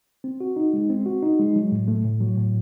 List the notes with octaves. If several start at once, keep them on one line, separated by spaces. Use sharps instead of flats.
C4
F#4
D#4
G#3
C4
F#4
D#4
G#3
F#3
A2
A3
A2
F#3
A2